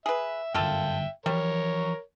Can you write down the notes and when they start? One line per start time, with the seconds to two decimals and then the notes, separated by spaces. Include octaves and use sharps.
0.06 G#4 B4 E5
0.54 G1 F#2 A#3 F4 A4 E5 G5
1.26 E3 F3 G3 A#4 C#5